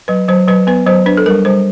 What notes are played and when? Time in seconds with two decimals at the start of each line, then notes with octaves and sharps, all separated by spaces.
0.08 F#3 B4
0.28 F#3 C5
0.48 F#3 B4
0.67 B3 B4
0.86 F#3 C5
1.06 D4 B4
1.17 A4
1.26 G3 A#4
1.45 G3 C5